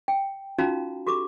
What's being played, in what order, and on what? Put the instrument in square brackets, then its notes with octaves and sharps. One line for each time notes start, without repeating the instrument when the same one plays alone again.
[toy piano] G5
C#4 D#4 F4 F#4 F5 A#5
F#4 G4 A4 D6